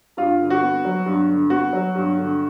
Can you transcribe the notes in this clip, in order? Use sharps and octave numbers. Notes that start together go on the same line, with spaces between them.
G2 F4
D3
F#4
B3
F#3
G2
D3
B3 F#4
F#3
G2
D3